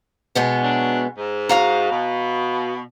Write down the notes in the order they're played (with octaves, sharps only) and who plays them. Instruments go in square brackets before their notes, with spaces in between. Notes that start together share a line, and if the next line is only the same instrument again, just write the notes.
[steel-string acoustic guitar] B2 G#3 B3
[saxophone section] F#3 D4
G#2
[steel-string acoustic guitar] F#4 F5 A#5
[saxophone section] B2